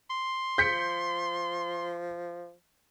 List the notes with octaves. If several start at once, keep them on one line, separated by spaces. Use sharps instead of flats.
C6
F3 G6 B6 C#7